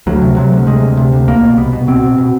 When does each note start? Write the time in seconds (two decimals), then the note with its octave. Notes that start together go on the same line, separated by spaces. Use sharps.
0.07 D2 F#3
0.22 C3
0.37 C3 F#3
0.53 D2
0.67 C3 G#3
0.82 D2
0.97 C3
1.12 D2
1.27 C2 A#3
1.43 B2
1.58 C2 B3
1.73 B2
1.88 B2 C4
2.03 B2
2.18 B2